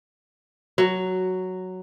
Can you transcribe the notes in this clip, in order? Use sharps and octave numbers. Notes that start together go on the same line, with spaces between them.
F#3